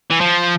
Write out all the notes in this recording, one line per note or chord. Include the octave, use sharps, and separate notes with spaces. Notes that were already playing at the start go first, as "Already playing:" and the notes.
E3
F3